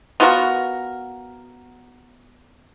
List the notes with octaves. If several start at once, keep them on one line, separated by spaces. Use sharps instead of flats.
B3 F4 F#4 A#4